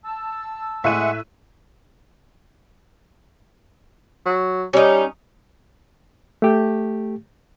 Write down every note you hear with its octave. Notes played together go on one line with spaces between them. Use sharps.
A5 E6
A2 G#3 E5 F#5 C#6 F#6 D#7
F#3
G3 C#4 D#4
A3 G4